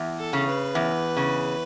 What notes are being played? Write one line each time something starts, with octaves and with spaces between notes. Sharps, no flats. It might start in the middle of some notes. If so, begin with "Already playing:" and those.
Already playing: E2
A4
C#3
B4
E2
C#3